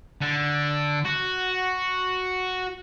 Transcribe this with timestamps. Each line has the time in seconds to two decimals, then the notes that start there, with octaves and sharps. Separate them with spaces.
0.21 D3
1.05 F#4